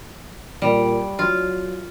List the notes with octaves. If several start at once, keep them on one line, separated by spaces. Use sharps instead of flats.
A#2 G3
F#3 F4